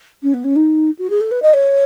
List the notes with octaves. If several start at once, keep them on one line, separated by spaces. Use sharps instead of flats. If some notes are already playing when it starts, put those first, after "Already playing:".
C#4
B3
C#4
D#4
F#4
G#4
A4
B4
D#5
C#5